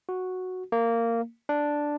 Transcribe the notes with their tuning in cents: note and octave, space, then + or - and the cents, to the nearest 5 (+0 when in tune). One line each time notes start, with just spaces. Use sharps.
F#4 -5
A#3 -15
D4 +0